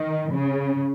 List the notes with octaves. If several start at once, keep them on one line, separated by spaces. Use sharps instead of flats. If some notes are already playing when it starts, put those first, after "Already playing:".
Already playing: D#3
C#3